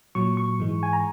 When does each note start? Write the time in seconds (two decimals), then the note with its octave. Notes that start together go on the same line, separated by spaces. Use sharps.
0.15 A#2 F#3 C#6
0.37 C#6
0.60 G#2 E3 G#3
0.83 G#5
0.93 A#5